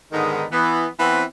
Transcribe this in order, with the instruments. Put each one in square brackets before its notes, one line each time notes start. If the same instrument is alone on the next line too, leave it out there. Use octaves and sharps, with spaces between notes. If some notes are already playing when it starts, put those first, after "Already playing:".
[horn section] G#2 D3 D#3 G#3 B3 D#4
E3 B3
E3 B3 C4